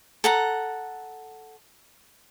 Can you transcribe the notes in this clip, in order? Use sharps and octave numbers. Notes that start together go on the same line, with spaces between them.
A4 F#5 A#5